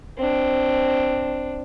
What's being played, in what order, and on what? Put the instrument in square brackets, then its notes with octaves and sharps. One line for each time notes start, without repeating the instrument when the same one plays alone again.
[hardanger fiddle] C4 D4